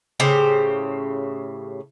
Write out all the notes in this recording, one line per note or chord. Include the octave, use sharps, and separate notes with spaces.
A2 C#3 G4 C5